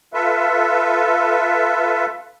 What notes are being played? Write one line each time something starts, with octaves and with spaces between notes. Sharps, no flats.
F4 A4 B4 E5